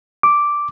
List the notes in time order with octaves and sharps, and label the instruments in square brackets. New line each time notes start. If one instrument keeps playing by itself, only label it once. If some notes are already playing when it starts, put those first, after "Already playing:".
[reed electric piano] D6